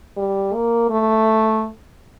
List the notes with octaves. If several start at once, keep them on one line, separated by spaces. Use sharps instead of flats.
G3
A#3
A3